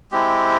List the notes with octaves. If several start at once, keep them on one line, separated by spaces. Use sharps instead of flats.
G#3 C4 E4 G4